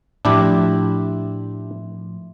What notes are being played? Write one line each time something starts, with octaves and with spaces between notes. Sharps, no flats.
A2 F3 D4 E4 G4